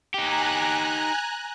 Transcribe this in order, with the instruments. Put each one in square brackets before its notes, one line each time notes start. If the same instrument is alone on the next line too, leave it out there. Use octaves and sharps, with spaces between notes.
[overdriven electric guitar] D#4 G4 [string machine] G#5 A#5 F#6